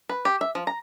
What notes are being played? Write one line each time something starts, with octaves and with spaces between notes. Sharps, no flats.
B4
G4
E5
F3
A#5